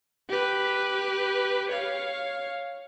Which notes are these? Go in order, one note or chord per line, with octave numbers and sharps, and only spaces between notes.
G4 B4
C#5 F5